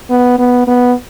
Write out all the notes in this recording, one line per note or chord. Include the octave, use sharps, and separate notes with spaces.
B3
B3
B3